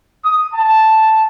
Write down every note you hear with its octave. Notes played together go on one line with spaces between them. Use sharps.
D#6
A5